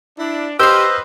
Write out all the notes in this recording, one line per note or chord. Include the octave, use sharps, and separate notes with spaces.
D4 E4
G4 B4 C5 D#5 F5 E6